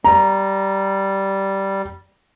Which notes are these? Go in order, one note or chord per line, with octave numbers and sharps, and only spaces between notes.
G3 A#5